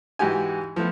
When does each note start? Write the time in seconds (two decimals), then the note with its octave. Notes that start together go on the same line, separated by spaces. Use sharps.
0.19 G#2 E3 F#4 G4 G#5
0.76 F3 A3 B3